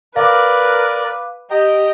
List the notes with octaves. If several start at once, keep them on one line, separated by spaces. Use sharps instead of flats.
A#4 B4 D5 F5 D6
G4 D#5 G5 A#5